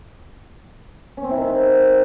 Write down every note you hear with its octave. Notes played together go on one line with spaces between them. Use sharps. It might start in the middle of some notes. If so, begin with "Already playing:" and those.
C#4
C4
E4
D#3
C4